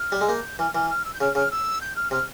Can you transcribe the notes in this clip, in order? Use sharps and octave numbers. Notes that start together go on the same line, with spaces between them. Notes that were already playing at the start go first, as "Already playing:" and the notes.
Already playing: F6
G3
G#3
A#3 G6
E3 F6
E3 F6
F6
E6
G6
C#3 F6
C#3 F6
E6
G6
F6
C3 F6